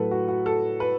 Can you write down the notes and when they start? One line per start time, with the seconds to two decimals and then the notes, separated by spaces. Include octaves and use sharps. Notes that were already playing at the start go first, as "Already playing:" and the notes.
Already playing: A2 F#3 A3 A4 B4
0.11 F#4
0.28 F#4
0.46 A4
0.80 B4